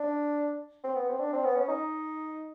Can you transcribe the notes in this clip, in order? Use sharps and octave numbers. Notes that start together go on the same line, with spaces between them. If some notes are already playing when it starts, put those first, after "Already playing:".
Already playing: D4
C4
B3
C4
D4
C4
B3
C#4
D#4